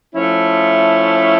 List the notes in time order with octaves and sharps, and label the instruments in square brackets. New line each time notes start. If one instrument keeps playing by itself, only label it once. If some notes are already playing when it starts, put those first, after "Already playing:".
[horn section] F3 A3 C#4 E4